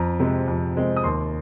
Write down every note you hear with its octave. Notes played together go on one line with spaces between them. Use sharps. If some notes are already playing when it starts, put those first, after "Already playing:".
Already playing: F2 A#5
C3 G#3 C4
F2
C3 G#3 C4
D#6
D#2 C6